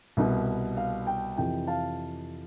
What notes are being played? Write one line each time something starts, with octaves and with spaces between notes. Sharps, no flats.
C2 B2
F5
G5
F2 C3 E3 G5
F5 A5